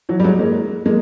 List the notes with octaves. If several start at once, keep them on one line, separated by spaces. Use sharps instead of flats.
E3 F#3
G3
F#3 G#3
G#3 A#3
G#3 A#3